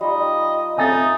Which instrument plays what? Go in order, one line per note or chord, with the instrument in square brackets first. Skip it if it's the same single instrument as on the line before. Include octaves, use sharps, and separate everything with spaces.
[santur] G3 D#4 F4 [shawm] D#5
[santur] A3 A4 [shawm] D#4 [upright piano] G#5 D#6 A6